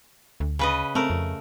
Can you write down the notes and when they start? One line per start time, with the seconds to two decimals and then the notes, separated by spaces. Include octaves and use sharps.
0.40 D2
0.59 C#3 B4 D#5
0.95 A3 C4 A#4
1.10 F2